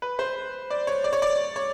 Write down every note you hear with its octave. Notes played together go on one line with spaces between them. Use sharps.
B4
C5
D5
C#5
D5
C#5
D5
C#5